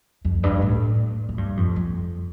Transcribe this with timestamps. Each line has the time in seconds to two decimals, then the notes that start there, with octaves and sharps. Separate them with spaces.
0.25 F2
0.43 G2
0.62 A2
1.29 A2
1.38 G2
1.57 F2
1.76 F2